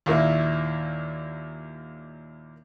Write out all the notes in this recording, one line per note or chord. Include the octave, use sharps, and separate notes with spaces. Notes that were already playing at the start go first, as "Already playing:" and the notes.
D#2 A#2 A#3 E4